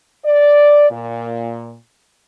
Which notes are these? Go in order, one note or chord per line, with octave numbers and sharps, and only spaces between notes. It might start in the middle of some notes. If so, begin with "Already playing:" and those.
D5
A#2